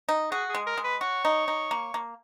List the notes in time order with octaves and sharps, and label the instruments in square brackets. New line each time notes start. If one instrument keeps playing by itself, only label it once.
[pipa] D#4
[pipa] F#4 [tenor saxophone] G#4
[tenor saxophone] G#4
[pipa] G#3
[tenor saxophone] A#4
[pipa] G#3
[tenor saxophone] B4
[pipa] F#4 [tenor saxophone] C#5
[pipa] D#4
D#4
A#3
A#3